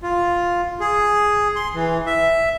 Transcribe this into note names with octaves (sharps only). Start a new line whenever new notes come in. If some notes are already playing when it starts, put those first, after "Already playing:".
F4
G#4
C6
E3
E5